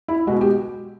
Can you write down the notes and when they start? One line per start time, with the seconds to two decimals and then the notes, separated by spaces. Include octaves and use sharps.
0.08 E4
0.27 B2 G#3 F#4
0.41 G4